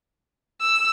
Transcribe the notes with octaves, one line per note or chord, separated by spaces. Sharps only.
E6